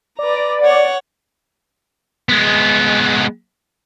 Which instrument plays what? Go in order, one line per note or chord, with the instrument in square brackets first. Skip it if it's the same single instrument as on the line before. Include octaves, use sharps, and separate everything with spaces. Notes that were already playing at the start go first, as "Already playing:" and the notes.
[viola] B4 A#5 [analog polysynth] D5
[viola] C#5 F#5
[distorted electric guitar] G#3 B3